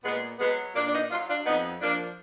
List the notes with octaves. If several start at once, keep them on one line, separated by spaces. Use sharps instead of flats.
A#2 G#3 B3
F#3 G#3 B3
A#2 A#3 D4
D4
B3 D#4
F#3 D4 F4
D4 F4
F2 B3 D#4
F3 A#3 D4